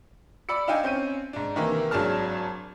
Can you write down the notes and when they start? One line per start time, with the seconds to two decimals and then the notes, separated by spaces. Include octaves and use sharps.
0.49 D5 B5 D6 E6 C#7
0.68 D4 D#4 F5 G5 G#5
0.83 C4 C#4 G6 D#7
1.33 G#2 D4
1.55 C3 D#3 E3 A#3
1.91 G#1 F#3 D4 G#4 A5 F6